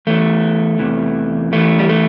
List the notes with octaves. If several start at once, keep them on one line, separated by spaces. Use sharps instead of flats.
E2 E3 A3
E2 C3 E3
E2 E3 A3
G3
A3